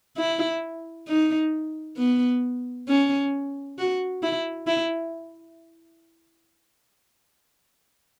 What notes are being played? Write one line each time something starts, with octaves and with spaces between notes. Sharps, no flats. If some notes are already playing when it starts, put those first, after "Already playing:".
E4
D#4
B3
C#4
F#4
E4
E4